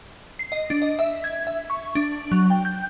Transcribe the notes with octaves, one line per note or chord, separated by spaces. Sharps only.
C7
D#5
D4
D#5
E5
G#6
E5
C#6
D4
F#3
G5
G6